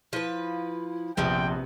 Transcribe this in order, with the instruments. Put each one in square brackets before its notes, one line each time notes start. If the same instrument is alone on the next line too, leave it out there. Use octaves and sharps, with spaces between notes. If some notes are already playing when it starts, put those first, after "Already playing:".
[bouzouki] F3 B4 [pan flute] E4
[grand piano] A#1 [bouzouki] C3 B3 [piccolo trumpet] G5 [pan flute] C6